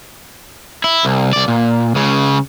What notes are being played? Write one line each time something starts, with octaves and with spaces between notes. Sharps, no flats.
E4
C2
C2 D5
A#2
C#2 C#3